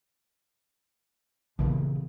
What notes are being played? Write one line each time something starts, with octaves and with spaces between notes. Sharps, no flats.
A#2 C#3 E3 F3 B3